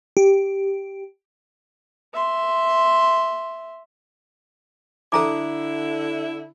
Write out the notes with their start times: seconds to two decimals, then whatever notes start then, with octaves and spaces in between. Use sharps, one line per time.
0.17 G4
2.14 E5 C6
5.12 D3 E4 A4 A#5 D6